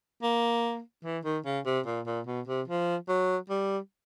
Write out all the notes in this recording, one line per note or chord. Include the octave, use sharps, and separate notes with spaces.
A#3
E3
D#3
C#3
C3
A#2
A#2
B2
C3
F3
F#3
G3